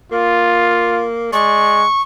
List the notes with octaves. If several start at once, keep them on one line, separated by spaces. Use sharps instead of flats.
A#3 F4
G#3 D5 C#6